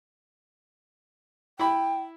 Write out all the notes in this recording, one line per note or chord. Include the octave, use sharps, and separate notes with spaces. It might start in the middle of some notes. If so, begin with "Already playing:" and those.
E4 G5 B5